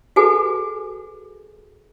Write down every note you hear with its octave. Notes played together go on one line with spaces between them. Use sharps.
F#4 G#4 A4 B4 G#5